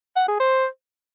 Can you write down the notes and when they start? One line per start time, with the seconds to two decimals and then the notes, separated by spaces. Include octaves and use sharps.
0.16 F#5
0.28 G#4
0.40 C5